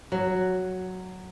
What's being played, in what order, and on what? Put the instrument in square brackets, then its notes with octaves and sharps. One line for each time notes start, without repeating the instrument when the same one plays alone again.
[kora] F#3